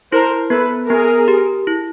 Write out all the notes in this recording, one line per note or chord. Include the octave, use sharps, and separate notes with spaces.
E4 A#4 C5
B3 A4 B4
B3 G#4 A#4
G4
E4